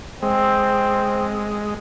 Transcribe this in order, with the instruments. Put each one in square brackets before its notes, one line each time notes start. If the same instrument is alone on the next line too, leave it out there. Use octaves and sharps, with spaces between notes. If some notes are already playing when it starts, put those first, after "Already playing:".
[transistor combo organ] G#3 [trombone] C4